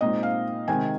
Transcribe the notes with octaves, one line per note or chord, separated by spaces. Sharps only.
A#2 G#3 C4 D#4 D#5
F5
C3 D#3 G#3 G#5